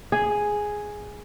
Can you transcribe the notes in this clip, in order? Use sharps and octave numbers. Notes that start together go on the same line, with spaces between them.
G#4